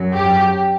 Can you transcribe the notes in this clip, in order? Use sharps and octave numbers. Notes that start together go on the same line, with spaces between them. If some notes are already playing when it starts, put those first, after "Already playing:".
Already playing: F#2 F#3
G4